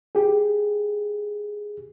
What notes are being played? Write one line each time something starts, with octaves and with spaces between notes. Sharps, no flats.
G4 G#4